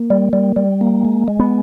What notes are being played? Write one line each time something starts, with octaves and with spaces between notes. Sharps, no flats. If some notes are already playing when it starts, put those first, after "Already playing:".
Already playing: A#3
G3
G3
G3
A#3
G#3
G#3
B3